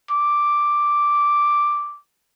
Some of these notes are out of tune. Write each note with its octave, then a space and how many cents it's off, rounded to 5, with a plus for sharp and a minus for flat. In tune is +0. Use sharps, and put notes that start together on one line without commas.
D6 +0